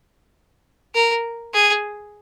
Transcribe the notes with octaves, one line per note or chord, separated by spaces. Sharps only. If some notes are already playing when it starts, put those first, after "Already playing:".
A#4
G#4